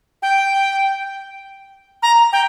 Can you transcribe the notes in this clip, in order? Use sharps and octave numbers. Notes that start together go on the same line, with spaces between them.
G5
A#5
G5